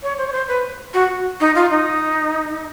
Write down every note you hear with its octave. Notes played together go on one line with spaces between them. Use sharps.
C#5
C5
C#5
C5
B4
F#4
D#4
F4
D#4